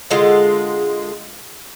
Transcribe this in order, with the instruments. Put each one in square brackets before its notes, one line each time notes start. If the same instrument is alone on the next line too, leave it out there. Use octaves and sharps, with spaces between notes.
[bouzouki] D3 G#3 F4